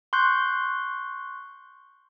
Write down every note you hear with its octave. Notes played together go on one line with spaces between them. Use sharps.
C6 C#6 F#6 G6